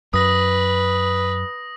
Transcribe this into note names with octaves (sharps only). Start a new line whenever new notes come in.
F#2 B4 D#6 A#6